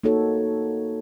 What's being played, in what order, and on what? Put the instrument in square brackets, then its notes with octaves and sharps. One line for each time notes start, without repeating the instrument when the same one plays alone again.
[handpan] A#3 D#4 F#4 A4 C#5